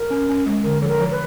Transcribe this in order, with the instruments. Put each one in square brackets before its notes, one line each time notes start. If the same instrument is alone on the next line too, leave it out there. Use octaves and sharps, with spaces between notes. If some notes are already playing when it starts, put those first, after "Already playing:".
Already playing: [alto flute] A#4
[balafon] C#4
C#4
G#3
[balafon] D3 [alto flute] A#4
[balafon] F3 [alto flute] A4
[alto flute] A#4
[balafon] F3
[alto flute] B4